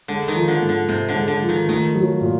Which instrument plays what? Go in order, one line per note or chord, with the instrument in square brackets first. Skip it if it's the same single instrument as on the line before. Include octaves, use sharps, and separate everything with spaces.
[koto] D3 [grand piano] G#3
[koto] D#3
[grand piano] F3
[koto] D3
[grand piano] G#2
[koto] D3
[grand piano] G#2 [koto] C3
[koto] D3
[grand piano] G#3
[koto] D3
[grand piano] F3
[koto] D#3
[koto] D#3 [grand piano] A3
[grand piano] F#3
A#2